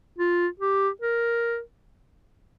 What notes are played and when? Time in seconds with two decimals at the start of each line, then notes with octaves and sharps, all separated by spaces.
0.18 F4
0.60 G4
1.02 A#4